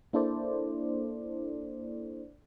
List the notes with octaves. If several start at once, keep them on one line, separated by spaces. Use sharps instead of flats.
A#3 D4 E4 A4 C5 D5